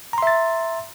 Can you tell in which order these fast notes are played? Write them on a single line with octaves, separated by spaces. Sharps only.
A#5 C6 E5 A6